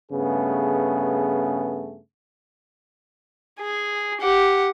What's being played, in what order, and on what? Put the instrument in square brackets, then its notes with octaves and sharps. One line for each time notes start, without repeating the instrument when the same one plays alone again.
[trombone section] G2 C#3 A3 B3 G#4
[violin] G#4
G4 F#5